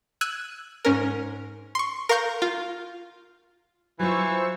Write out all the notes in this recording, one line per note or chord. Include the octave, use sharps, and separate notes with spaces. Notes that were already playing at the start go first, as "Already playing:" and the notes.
E6 F#6 G#6 D#7
G#2 C#4 A#4
C6 C#6
A#4 F5 C#6 G6
F4
E3 F#3 F4 C5 C#6 E6